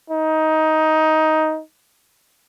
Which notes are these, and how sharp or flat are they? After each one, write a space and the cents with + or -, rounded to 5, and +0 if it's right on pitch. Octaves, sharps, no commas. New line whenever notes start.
D#4 +15